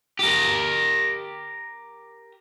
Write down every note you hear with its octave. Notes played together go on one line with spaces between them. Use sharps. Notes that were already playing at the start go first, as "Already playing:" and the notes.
G4 A#4